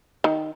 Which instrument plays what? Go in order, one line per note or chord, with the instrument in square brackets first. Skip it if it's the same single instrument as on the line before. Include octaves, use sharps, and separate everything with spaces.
[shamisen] D#3